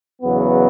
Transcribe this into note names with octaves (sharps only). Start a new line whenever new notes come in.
E2 C#3 F#3 B3